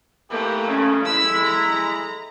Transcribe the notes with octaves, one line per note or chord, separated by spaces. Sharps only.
G#2 E3 A3 A#3 G4
G2 C#3 C#4 A4
G#3 E4 B5 E6
A#5